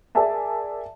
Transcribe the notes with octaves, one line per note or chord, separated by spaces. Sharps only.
G#4 A#4 D5 E5 G#5 A5